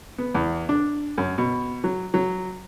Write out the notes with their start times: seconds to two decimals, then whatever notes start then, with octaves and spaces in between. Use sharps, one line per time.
0.18 B3
0.35 E2
0.69 D4
1.18 F#2
1.38 B2
1.84 F#3
2.14 F#3